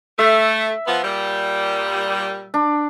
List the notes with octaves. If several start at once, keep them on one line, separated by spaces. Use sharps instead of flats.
A3 E5
F3 B3
A#2 G3
D4